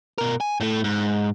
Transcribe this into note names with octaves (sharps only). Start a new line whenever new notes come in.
B2 A#4
G#5
A2 A3
G#2